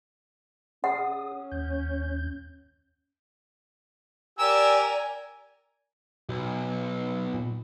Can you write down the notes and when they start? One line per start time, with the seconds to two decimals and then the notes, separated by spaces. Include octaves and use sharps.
0.84 C#4 G#4 F#5 D#6
1.52 D#2 G6
4.39 G4 A#4 D5 G#5 E6
6.29 B1 B2
7.34 A#2